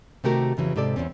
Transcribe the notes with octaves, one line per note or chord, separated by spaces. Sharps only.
C3 D#3 A3 F#4 G4 A#4
F2 C#3 E3 F#3
G#2 C3 G4 A4 D5
E2 G#2 C4 C#4